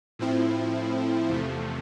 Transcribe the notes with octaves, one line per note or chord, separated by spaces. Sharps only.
A2 F3 C4 E4
E2 C3 F3 A3